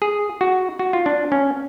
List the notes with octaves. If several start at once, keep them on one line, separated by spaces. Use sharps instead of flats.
G#4
F#4
F#4
F4
D4
C#4